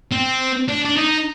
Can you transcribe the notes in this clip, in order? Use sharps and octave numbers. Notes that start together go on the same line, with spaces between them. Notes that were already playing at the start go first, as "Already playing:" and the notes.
C4
D4
D4
D#4